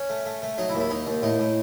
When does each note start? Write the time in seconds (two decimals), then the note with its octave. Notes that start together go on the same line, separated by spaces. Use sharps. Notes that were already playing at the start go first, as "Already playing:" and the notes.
Already playing: C#4
0.10 A3
0.26 A3
0.42 A3
0.58 F#3 D#4
0.69 E4
0.75 D#2
0.80 E4
0.90 D#2 D#4
1.07 D#2
1.22 A2 D#4
1.39 A2